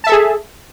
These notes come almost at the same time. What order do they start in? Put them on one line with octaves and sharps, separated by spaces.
A5 E5 A4 G#4